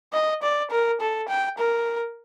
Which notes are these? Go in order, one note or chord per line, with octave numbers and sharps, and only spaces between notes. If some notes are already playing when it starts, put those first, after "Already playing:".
D#5
D5
A#4
A4
G5
A#4